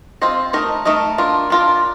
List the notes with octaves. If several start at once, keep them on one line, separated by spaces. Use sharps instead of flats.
C4 F4 C5 D#5
A3 D#4 A#4 D#5
A3 D#4 A#4 D#5
D4 F4 A#4
D4 F4 A#4